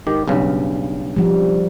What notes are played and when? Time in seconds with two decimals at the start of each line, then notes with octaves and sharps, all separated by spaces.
0.07 G#2 D#3 G4
0.28 B1 G2 C#3
1.16 F3 G3